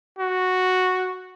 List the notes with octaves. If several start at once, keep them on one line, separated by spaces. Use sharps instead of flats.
F#4